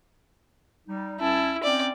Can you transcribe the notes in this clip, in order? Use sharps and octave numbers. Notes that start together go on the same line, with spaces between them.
G3 D#4
C2 C#4 E4 A5
C4 C#4 D#4 D5